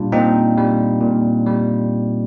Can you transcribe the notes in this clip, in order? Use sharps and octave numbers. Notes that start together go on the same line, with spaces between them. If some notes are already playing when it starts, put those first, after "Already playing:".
Already playing: A#2 G3 D4 F4
A#2 C4 D#4
G3
A#2
G3